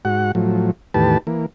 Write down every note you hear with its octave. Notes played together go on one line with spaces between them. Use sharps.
G#2 F#4 F#5
A2 F3 F#3
E2 A2 D#3 G4 B4 A5
E3 A#3